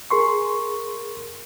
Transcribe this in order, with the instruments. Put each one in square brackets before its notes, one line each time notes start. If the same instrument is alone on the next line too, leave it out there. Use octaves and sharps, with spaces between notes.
[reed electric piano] G#4 A#4 C6 C#6